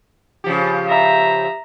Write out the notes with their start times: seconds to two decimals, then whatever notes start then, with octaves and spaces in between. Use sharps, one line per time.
0.44 C#3 F3 G4
0.88 E5 A#5